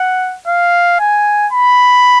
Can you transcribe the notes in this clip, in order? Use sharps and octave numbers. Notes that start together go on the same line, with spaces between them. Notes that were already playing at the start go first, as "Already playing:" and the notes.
Already playing: F#5
F5
G#5
B5